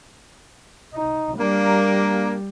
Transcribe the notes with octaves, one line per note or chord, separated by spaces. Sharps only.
D#4
G3 A#3 D4 A#4